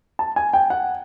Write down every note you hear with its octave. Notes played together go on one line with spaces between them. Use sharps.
A5
G#5
G5
F#5